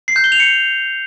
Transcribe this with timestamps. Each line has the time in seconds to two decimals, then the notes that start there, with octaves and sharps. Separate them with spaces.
0.08 C7
0.16 G6
0.24 G7
0.32 F7
0.40 C#7